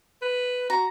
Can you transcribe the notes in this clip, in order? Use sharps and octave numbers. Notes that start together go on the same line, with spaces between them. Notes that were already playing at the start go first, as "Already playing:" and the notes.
B4
F#4 A#5